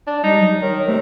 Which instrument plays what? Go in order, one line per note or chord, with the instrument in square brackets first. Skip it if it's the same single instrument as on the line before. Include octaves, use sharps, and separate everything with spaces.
[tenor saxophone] D4
[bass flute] G3 [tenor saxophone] D#4
[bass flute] F#3
[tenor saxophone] D#3 [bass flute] C#5
[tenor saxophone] C3 [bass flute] A3